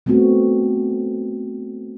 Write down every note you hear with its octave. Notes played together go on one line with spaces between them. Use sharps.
G3 A3 B3 C4 F#4